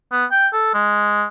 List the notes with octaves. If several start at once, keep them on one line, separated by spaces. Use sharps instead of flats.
B3
G5
A4
G#3